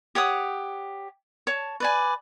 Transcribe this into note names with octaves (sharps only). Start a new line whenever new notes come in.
G4 C#5 F#5 D#6
C#5 A5
B4 D5 G#5